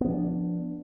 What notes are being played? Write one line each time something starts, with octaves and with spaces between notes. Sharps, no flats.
F3 B3 D4